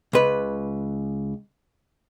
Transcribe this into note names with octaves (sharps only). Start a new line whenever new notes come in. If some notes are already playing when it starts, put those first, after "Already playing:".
C#2 B4